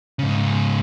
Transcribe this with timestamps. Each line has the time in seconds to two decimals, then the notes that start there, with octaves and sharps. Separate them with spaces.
0.19 G#2 C#3